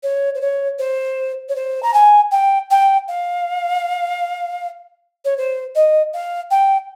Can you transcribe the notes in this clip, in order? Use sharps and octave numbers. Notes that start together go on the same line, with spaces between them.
C#5
C5
C#5
C5
C#5
C5
A#5
G#5
G5
G5
F5
C#5
C5
D#5
F5
G5